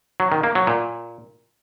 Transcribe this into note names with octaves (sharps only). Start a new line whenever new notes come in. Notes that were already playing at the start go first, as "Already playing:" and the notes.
F#3
D#3
A#3
F#3
A#2